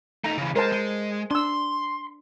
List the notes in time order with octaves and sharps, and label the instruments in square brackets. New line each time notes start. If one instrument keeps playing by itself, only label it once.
[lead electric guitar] A3 D#4 [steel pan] A#5
[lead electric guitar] C#3 E3
[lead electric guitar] G#3 [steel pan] A#4 C5 A5
[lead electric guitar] G#3
[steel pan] D4 E6 [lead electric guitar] C6